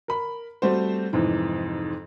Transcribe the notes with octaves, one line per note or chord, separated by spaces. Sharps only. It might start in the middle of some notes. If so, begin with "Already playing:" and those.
A#4 B5
G3 A3 C4 F#4 C5
F2 G#2 C3 E3